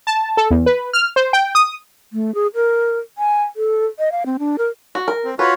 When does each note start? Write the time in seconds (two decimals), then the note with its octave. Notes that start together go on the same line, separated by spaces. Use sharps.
0.07 A5
0.37 A4
0.51 E2
0.66 B4
0.93 F6
1.16 C5
1.33 G5
1.55 D#6
2.13 A3
2.35 G#4
2.55 A#4
3.18 G#5
3.56 A4
3.99 D#5
4.12 F5
4.26 C4
4.39 D4
4.58 A#4
4.95 F#4
5.08 A#4
5.25 C4
5.39 F4 F#4 B4 C#5